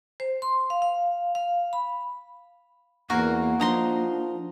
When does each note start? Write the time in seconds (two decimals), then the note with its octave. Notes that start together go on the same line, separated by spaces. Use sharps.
0.20 C5
0.42 C6
0.70 F5
0.82 F5
1.35 F5
1.73 B5
3.10 E2 A#3 F#4 A#4
3.60 F3 D4 D#4 A#5 C6